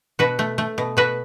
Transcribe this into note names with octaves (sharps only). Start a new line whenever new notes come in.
B2 F#4 B4
A3
A3
B2
B2 F#4 B4